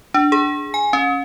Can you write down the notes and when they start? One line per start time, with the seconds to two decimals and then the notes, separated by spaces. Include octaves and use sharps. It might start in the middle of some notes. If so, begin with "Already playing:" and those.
0.14 D4
0.32 G#4
0.74 G#5
0.93 C#4